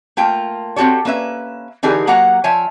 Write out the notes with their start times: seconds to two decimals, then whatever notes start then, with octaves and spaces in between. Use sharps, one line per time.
0.17 A3 A#3 F4 G5
0.76 C4 F#4 G4 A4 C#5
1.05 A#3 C#4 B4 E5
1.83 D3 E3 D#4 G4 G#4 A#4
2.07 F#3 A#3 F#4 F#5 A#5
2.44 F3 C#5 E5 G#5